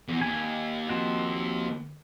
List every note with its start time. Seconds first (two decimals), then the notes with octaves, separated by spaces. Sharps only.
0.08 E2
0.21 D#2 G#5
0.89 F3 C4 F#4